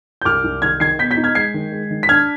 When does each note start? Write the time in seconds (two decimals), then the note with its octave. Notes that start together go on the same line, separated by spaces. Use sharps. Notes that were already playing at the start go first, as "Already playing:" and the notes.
0.22 G6
0.25 C2 D6 F6
0.44 C2
0.62 D#3 F6 G#6
0.80 D#3 G#6 C7
0.99 B2 G6 B6
1.11 G6 B6
1.17 D#4
1.24 F6 G#6
1.35 G#3 G#6 C7
1.54 D#3
1.72 G#3
1.91 D#3
2.03 B6
2.09 D4 F6 G#6